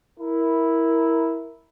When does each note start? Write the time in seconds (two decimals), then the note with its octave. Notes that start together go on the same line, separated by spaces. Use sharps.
0.19 E4 A#4